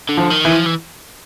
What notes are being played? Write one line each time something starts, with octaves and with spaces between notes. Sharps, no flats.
D3
F3
D#3
E3
F3
E3